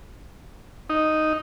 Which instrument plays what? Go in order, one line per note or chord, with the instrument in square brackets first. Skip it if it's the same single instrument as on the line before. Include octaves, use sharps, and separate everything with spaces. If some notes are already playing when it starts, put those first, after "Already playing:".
[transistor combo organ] D#4